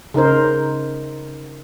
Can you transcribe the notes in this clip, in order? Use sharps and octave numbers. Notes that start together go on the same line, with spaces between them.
C#3 D#4 A#4 C5